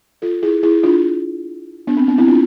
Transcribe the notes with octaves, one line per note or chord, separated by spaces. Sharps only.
F4 A4
E4 G#4
E4 G#4
D4 F4
B3 D4
C4
B3 D4
C4 E4
D4 F4